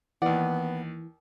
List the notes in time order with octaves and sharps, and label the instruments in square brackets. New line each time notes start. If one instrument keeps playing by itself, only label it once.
[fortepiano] D#2 D5 [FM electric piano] E3 [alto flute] B3 [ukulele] F#5